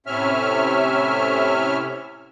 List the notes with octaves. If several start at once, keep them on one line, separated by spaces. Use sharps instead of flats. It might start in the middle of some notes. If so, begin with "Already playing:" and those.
A2 C3 C#4 E5 F6